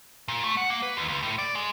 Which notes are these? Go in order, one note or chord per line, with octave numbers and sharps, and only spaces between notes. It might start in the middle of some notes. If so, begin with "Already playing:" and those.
A#2
A3
F#5
A#3
B4
D#2
C#2
A2
D5
G#3